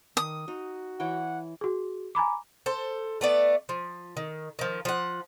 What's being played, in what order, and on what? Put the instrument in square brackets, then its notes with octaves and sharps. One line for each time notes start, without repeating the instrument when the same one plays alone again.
[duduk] D#3 [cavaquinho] D#6
[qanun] D#4 [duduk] F#4
[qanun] E3 C#5 G5 [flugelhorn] F#5
[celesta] F#4 G#4
G#5 A#5 B5 D6
[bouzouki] A4 C5
A3 B3 D5
F3
D#3
D#3 F3
F3 F#5